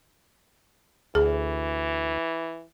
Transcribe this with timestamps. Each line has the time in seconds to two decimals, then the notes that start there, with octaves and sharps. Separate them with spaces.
1.15 D2 E3 G#4